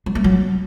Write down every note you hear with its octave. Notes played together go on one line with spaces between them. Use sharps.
F#3
A3
F#3